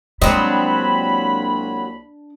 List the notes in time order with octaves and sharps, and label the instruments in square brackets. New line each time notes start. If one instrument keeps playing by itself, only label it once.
[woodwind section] C2 A#3 B5 [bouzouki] F#3 C4 [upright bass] G#3 [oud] D4 D#5